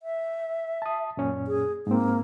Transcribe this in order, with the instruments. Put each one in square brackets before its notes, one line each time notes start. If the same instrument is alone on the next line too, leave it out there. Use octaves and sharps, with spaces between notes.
[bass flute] E5
[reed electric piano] A5 D#6
F#2 A#2 C#4
[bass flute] G#4
[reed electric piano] G#2 C4 [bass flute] A#3